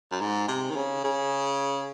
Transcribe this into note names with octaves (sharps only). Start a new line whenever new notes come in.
F#2
G#2
C3
D#3
C#3
C#3